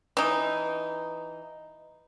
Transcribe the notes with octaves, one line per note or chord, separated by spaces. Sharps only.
E3 D#4